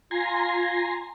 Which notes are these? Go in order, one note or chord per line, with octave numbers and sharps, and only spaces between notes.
F4 G#5 A#5 C6